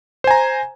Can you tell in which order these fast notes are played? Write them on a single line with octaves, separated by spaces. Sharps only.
C5 G#5 A#5